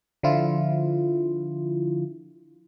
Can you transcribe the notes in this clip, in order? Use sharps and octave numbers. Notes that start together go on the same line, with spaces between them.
D3 F3 E4 F4